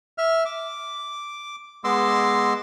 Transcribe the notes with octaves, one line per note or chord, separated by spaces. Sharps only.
E5 F6
D6
G#3 B3 D#5 C6 D6 E6